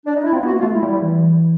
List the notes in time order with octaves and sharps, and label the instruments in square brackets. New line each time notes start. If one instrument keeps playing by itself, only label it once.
[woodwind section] D4
D#4
E4
[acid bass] C4 [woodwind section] F4
[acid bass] B3
[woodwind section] F#4
[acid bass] A#3
[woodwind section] F4
[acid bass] A3
[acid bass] G#3 [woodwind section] E4
[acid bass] G3
G3
E3